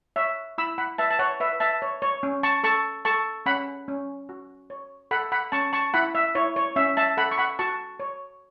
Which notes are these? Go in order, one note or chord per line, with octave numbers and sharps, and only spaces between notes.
C#5 E5
E4 B5 E6
F#5 B5
B4 E5 A5
A5
C#5 F#5
B4 E5
E5 A5
C#5
C#5
C#4
A5 C#6
A4 A5 C#6
A4 A5 C#6
C#4 F#5 B5
C#4
F#4
C#5
A4 F#5 B5
F#5 B5
C#4 A5 C#6
A5 C#6
E4 F#5 B5
E5
E4 C#5
C#5
C#4 E5
E5 A5
A4 F#5 B5
C#6
F#5 B5
F#4 A5 C#6
C#5